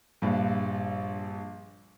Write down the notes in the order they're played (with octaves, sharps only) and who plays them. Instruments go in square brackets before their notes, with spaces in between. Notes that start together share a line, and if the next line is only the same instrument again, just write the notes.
[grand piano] A#1 G2